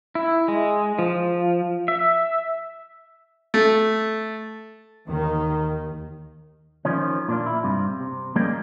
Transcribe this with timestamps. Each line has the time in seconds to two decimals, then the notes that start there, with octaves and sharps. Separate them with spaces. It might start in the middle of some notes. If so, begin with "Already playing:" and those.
0.15 E4
0.48 G#3
0.99 F3
1.88 E5
3.54 A3
5.08 D#2 D#3
6.85 D#3 F3 C#4
7.28 A#2 D4 F4
7.46 E4
7.64 G2 C3
8.00 C3
8.36 F3 G3 G#3 A#3 C#4